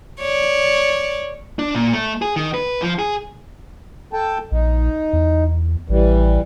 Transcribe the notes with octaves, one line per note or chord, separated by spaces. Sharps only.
C#5 D5
D4
A#2
A3
G#4
D#3
B4
F3
G#4
A4 G5 A5
A#1 D#4
E2
A1 E3 G3